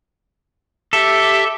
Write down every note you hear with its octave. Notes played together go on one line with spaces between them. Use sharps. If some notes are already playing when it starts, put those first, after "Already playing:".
G4 A4 E5